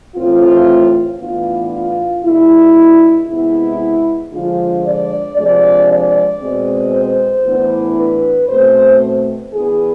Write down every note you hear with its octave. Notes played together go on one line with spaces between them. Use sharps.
A2 E3 A3 C4 F4
A2 E3 B3 D4 F4
F4
B2 G#3 D4 E4
C3 G#3 B3 E4
D3 F3 G#3 D4 F4
D5
C3 F3 G#3 D4 D5
D5
B2 G#3 C4
C5
A2 E3 B3 D4
B4
B2 A3 C4 C5
E3 B3 D4 G#4